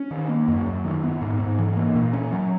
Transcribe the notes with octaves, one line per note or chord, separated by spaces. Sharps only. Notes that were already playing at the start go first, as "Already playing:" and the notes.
Already playing: C#4
D#3
A#3
F#2
F#2
D#3
B3
G#2
G#2
E3
A#3
A#2
C#4
F#3